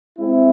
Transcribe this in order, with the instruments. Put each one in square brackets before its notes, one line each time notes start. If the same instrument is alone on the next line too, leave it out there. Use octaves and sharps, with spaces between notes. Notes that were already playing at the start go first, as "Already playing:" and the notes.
[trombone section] G#3 C4 E4